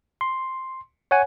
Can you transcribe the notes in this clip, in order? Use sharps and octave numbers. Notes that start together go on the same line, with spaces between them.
C6
C#5 F#5 G#5